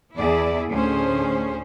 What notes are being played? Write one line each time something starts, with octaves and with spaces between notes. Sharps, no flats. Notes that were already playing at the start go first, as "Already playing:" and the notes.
E2 E4 G#4 D5 E5
D2 A2 C#4 G#4 C5